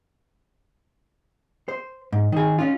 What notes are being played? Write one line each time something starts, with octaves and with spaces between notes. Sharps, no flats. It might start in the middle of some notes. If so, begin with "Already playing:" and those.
C5
G#2
D#3 G#4
C#4 D4 F4